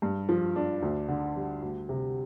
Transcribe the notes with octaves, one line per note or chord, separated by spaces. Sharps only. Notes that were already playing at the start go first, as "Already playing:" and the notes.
G2
F3
D4
D2
D3
G3
D2
C3